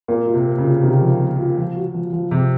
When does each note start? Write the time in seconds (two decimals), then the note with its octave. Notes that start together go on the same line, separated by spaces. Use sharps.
0.08 A#2 A#3
0.27 F4
0.34 C3
0.46 A#3
0.58 C#3
0.64 F4
0.83 C3 D#3
1.01 F3
1.20 A#3
1.38 F4
1.57 F3
1.76 F#4
1.94 F3
2.13 F3
2.31 C3 F3